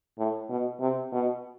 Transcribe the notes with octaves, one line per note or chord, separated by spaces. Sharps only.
A2
B2
C3
B2